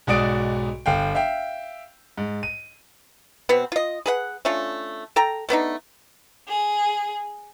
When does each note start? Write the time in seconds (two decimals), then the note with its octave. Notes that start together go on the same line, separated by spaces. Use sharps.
0.07 B1 G#2 F#4 D5 D#6 D7
0.86 G1 F5 G5
1.15 E5 F5 G5
2.18 G#2
2.43 D#7
3.49 B2 B3 C4
3.72 F4 D#5
4.06 G#4 B4 F#5
4.45 A3 C#4 D4 F4
5.16 A4 G5 A#5
5.49 A3 B3 D4 D#4
6.48 G#4